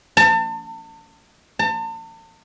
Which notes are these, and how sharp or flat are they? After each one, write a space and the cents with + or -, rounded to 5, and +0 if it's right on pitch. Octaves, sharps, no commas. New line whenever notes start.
A5 +35
A5 +40